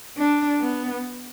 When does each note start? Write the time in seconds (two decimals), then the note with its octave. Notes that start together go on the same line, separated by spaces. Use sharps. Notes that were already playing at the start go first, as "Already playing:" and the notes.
0.18 D4
0.61 B3